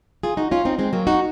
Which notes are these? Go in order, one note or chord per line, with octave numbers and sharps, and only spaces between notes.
F4 G#4
D#4 F#4
C#4 F4
C4 D#4
G#3 C4
F#3 A#3
D#4 F#4